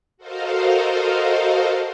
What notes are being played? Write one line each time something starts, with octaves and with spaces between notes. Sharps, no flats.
F#4 A4 A#4 C5 D#5 F5